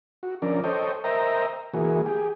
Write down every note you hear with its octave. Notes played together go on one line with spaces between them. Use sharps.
F#4
F3 C#4 D4 A#4 D5
A4 C5 C#5 D#5 G5
A#4 C5 D#5 E5 G5 A#5
E3 A#3 F#4 G#4
G4 G#4